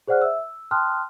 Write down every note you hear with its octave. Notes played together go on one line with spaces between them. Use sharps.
G#4 C5 D5 F#5 F6 F#6
E5 E6
E6
G5 A5 C6 D#6 F6 F#6